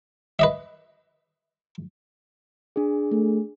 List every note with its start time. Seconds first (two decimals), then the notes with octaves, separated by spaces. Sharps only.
0.39 B4 D#5 E5
2.76 D4 G#4
3.11 A3